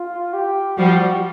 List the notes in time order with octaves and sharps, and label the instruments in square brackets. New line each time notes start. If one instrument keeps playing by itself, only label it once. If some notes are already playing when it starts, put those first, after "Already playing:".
Already playing: [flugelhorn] F4
G4
[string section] F3 G3 [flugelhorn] F#4